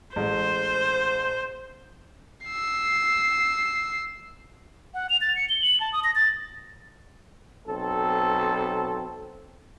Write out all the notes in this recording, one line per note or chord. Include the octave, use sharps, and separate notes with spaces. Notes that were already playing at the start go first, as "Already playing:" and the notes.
A1 G#3 C5
E6 C7
F#5
F7
A6
C#7
G7
F#7
A5
D#6
A#6
A6
B1 C4 A4